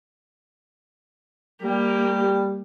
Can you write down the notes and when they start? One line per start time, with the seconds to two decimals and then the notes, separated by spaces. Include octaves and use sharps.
1.63 G3 A#3 G4